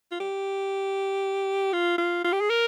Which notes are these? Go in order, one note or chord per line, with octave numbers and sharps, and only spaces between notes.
F4
G4
F4
F4
F4
G4
G#4
A#4